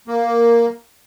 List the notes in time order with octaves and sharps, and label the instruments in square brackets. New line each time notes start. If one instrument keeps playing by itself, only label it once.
[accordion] A#3